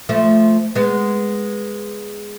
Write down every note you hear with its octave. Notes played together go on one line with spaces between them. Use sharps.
F3 A3
G#3 B3